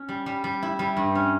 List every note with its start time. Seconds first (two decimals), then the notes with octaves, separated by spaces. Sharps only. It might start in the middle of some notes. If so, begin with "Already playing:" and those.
Already playing: C#4
0.09 G3
0.26 G3
0.44 G3
0.62 E4
0.79 G3
0.97 G2
1.15 C#4